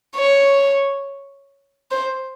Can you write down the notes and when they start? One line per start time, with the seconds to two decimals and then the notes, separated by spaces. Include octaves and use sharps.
0.16 C#5
1.91 C5